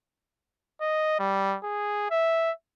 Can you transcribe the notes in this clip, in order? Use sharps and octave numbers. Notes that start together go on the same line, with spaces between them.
D#5
G3
G#4
E5